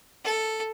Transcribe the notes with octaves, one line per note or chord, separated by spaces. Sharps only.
A4